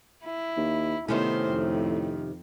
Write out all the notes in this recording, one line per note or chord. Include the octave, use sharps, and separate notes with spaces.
E4
D#2
A2 C3 D#3 B3 C#4 C5
F2